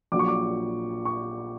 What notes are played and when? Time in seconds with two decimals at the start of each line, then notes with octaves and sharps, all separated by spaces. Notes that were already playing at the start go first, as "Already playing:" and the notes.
0.12 A#1 A#2 F#3 D6
0.19 C#6
0.28 D6
1.05 C#6